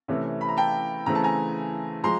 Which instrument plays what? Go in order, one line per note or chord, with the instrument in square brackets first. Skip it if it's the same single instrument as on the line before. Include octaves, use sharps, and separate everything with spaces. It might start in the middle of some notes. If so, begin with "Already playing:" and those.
[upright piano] C3 E3 A3 C#4
B5
A#5
G5 A5
C#3 E3 A3 C4 A#5
A5
G#5 A#5
F3 G#3 A#5 C6